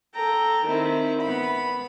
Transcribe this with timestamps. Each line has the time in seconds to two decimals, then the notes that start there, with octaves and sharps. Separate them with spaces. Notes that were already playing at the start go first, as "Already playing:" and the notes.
0.15 A4 G5 A#5
0.65 D#3 C4 E4
1.23 B3 B5